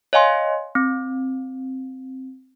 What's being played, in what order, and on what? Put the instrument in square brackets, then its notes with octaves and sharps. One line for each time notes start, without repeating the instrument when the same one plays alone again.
[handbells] C#5 D#5 F5 G#5 C6
C4